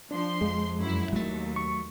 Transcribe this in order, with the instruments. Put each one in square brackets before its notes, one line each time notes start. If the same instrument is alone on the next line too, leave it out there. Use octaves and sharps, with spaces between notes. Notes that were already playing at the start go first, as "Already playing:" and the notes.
[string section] F3 C6 [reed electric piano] D4
[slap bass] F2 [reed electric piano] G#3
[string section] F#2 E4
[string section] D#2 [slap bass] F#3 A3
[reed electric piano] C#6